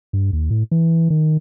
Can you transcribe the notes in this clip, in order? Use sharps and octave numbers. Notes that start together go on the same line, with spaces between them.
G2
D#2
A2
E3
D#3